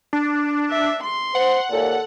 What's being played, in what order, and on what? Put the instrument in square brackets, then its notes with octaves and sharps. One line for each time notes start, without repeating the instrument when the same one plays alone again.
[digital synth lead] D4
[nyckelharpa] E5
C6
[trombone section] C5 [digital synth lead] F#5
[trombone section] D#2 A#2 [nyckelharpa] A4